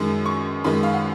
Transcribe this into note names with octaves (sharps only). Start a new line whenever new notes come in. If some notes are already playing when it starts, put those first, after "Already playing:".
Already playing: F#2 D#3 G#3
C#6
F#2 D#3 G#3 B5
F5
F#5